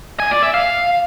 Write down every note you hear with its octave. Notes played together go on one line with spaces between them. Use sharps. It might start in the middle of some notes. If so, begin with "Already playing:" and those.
G#5
D5
E5
F5